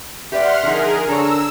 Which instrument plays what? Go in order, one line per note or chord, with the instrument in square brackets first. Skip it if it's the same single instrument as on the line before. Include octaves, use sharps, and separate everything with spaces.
[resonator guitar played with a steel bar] G4 B4 D5 [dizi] E5 [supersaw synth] F#5 C6 F6
[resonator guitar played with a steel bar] D3 F3 D#4 [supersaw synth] G#4 A#4
[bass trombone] D3 [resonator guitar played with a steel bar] A4 C#5 [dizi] A#5 [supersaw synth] E6